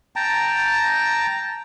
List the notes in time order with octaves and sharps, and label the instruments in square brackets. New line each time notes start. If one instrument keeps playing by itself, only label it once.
[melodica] G5 A5 A#5